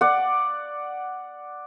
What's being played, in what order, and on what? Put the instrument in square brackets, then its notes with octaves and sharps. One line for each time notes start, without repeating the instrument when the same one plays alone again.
[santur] D5 F#5